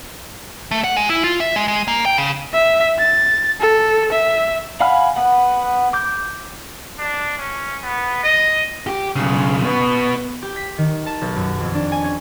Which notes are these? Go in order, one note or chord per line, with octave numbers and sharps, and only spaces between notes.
A3
F#5
G#3
E4
F4
E5
G#3
G#3
A#3
G5
C#3
E5
A6
A4
E5
F5 F#5 G#5 B5 F6
B3 F#5
D6 G6
D4
C#4
B3
D#5
G4
B1 C#3
B2 B3
G4
B6
D#3
A5
B1
F#2
F2
D4
G#5
C#4